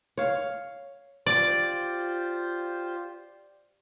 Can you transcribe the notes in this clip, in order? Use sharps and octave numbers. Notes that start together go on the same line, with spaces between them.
C#5 F5
F4 G4 C5 D5